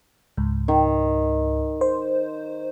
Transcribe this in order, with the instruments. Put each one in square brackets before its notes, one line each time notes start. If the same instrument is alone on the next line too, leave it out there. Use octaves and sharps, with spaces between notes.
[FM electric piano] C#2 G#2
[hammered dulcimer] D#3
[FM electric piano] C5